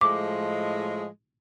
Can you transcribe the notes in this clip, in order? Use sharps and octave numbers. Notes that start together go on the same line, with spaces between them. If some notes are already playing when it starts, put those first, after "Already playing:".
A2 F3 G#3 D6